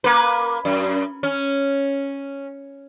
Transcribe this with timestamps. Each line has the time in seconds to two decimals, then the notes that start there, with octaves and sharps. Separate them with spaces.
0.04 A#3 B4
0.65 F#2
1.23 C#4